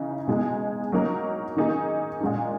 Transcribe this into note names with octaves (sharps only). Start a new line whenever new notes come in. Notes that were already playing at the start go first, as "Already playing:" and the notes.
Already playing: C#3 E3 D#4
B2 G#3 D#4 G#4
F#3 A#3 D#4 A#4
D#3 A#3 D#4 G#4
A#2 G#3 D#4